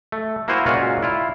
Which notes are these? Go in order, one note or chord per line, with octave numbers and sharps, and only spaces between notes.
A3
A#3 E4 F#4 C5 G#5 A#5
A#2 G#3 C#4 F4 F#4
E4 F4